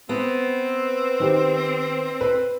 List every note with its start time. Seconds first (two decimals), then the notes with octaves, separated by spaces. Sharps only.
0.09 B3 C4
1.20 D#3 G4 C5
2.21 B4